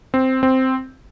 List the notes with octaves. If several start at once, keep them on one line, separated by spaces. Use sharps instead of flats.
C4
C4